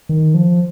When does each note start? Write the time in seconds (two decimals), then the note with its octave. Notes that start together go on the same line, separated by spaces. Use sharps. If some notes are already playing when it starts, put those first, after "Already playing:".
0.09 D#3
0.34 F3